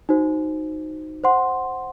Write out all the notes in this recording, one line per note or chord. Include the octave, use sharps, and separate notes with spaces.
D#4 F#4 C5
C5 F#5 C6